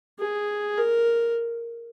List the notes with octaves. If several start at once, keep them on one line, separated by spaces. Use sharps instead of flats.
G#4
A#4